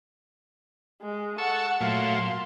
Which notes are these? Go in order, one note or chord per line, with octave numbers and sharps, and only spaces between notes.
G#3
A4 F#5 A5 C#6 E6
A#2 F#3 A3 F5 C6